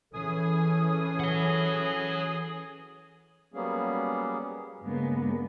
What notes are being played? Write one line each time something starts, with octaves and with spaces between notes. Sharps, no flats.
E3 C#4 G#4 A4 G#5 D#6
C#5 F#5
F#3 G3 A#3 B3 C#4 G#4
G2 C#3 G#3 A#3 B3